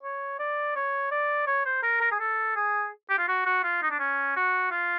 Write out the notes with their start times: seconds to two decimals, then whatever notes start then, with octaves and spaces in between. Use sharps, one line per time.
0.03 C#5
0.39 D5
0.76 C#5
1.12 D5
1.47 C#5
1.66 C5
1.83 A#4
2.01 A#4
2.12 G#4
2.20 A4
2.56 G#4
3.10 G4
3.19 F4
3.28 F#4
3.46 F#4
3.64 F4
3.83 D#4
3.91 D4
4.00 C#4
4.36 F#4
4.71 F4